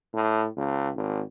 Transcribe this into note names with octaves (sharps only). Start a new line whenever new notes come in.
A2
C#2
G#1